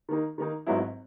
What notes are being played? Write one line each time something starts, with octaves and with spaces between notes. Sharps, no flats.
D#3 A#3 D#4
D#3 A#3 D#4
G#1 G#2 F#3 B3 E4